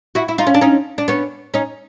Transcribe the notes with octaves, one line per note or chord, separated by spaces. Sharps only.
E4 F#4
E4
D#4 F4
C#4
D4
C#4 D#4
D4
B3 C#4
C#4 D#4